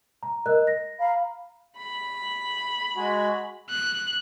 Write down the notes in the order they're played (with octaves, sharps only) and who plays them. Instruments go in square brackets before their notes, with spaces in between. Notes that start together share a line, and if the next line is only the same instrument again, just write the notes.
[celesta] A#5
A#4 D#5 F#6
A#6
[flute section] F5 A#5 B5
[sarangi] B5
[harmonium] G#3 F#4 G#4
[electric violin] F#6